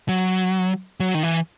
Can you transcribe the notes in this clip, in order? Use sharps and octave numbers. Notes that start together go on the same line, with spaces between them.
F#3
F#3
D#3
E3